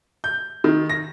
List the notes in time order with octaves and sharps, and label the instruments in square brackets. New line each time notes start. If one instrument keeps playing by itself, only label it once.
[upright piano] G6
D#3
A#6